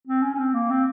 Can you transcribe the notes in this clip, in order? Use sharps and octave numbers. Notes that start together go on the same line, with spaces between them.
C4
C#4
C#4
C4
A#3
C4